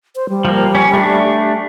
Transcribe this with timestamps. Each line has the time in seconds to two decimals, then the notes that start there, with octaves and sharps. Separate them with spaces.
0.16 C5
0.29 G3
0.45 F3 A#3
0.75 C#4
0.94 A3 D4